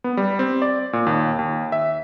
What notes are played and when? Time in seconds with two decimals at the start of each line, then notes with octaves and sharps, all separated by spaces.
0.04 B3
0.17 G3
0.39 C4
0.62 D5
0.93 A#2
1.07 D#2
1.39 D#2
1.72 E5